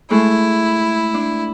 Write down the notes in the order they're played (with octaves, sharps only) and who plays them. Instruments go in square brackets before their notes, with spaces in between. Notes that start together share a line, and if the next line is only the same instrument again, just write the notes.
[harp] G#3 A3 [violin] E4
[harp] D4